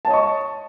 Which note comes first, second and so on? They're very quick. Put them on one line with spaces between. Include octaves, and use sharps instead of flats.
A5 C#5 D#5 C#6